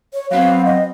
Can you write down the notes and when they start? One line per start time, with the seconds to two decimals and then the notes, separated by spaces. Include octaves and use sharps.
0.14 C#5
0.30 F#3 B3 C4 F5
0.66 D#5